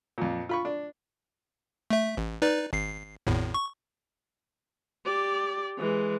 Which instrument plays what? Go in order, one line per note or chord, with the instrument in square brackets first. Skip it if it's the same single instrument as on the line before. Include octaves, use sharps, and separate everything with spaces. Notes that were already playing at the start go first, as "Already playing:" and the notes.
[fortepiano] F2 A#2
F4 B5 C#6
D4
[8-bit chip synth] A3 E5
A1
D#4 B4 D5
G#1 C7
G#1 E2 A2
C#6
[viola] G4 D5
E3 G#3